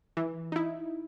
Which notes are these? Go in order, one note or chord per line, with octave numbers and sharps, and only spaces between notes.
E3
D#4 E4